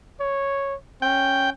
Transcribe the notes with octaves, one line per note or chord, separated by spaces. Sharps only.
C#5
C#4 G5